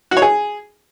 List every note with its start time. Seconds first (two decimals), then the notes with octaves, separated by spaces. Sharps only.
0.11 F#4
0.17 C#5
0.22 G#4